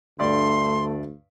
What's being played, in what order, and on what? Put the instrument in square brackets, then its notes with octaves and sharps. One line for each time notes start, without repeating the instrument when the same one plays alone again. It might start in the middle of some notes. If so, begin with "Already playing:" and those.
[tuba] D2 [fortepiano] G2 D5 [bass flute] A3 [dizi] C6